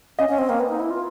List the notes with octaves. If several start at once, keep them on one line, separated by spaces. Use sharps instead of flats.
C#4 D#5
C#4
C4
A#3
B3
D#4
E4
F4